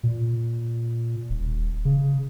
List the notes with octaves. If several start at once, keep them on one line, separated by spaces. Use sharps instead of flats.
A#2
D#1
C#3